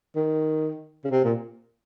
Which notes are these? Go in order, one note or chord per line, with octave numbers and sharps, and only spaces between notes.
D#3
C#3
C3
A#2